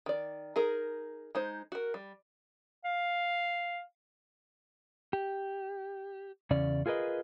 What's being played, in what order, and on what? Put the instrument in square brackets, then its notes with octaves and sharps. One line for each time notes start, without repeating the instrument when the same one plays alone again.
[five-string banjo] D#3 D5
D#4 G#4 A#4
G#3 D#4 C5
F#4 A#4
G3
[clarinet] F5
[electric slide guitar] G4
E2 C#3 C#4 D5
F4 G#4 A#4 B4 D#5